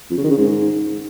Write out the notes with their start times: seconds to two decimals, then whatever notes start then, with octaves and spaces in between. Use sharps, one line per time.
0.11 F2
0.17 C#3
0.24 D#3
0.31 C#3
0.38 G#2